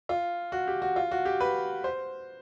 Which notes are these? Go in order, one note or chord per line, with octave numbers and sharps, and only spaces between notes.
F4
F#4
G4
F#4
F4
F#4
G4
B4
C5